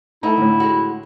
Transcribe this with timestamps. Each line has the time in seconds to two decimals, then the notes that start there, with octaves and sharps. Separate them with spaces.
0.23 A3 D#4 E4 A4 E5 A#5
0.38 A2 D3
0.60 G#3 F#4